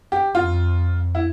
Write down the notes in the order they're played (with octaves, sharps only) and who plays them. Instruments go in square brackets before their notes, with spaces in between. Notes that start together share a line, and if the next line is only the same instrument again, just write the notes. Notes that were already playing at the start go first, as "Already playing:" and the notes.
[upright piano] G4
[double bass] F2 [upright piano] F4
[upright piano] E4